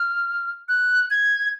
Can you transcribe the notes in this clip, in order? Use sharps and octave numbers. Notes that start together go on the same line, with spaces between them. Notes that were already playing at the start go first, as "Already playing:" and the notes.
Already playing: F6
F#6
G#6